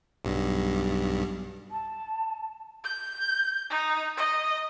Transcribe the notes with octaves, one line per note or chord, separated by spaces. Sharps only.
B1 G2
A5
G6
D#4
D#5